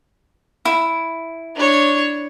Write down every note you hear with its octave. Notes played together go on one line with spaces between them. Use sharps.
E4
D4 C#5